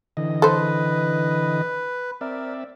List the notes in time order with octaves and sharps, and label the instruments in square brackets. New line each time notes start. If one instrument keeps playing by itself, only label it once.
[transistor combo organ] D3 E3 D#5
[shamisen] A4 C5 [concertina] B4
[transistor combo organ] C4 D5 E5 [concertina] A#4